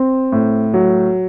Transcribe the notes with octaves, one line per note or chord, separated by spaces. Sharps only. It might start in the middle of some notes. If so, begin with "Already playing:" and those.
Already playing: C4
A2
F#3